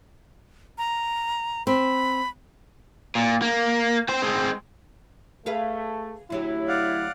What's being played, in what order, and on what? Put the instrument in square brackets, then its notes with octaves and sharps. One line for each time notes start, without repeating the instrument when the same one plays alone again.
[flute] A#5
[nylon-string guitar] C4 [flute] B5
[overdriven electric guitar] A#2
A#3
C4 C5
G#3 C4
[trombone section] A3 [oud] G#4 B4 F5
[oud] D2 F#3 G4 [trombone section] E4
[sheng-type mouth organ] D5 F5 F#5